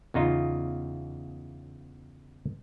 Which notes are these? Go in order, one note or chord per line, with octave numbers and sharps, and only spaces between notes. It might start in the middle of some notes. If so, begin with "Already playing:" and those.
E2 C#3 D#4 F4